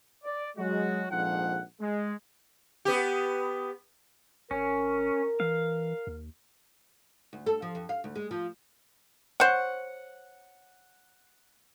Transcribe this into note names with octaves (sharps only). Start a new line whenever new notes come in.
D5
F#3 G#3 F#4
A#1 F2 G#2 F3 F#5
G#3
B3 G4
G#1 C#4 A#4
E3 F5
D#2
D2
A4
F3
F2
F5
D2
G#3
F3
C5 C#5 F#5